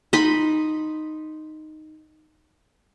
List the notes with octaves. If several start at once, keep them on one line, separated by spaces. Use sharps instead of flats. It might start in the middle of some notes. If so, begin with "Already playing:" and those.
D#4 D#5 B5 C6